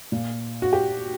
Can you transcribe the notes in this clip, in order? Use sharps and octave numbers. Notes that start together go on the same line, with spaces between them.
A#2
F#4
G4